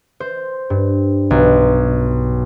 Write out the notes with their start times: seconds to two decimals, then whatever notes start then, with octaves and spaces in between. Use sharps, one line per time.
0.20 C5
0.70 G2
1.31 B1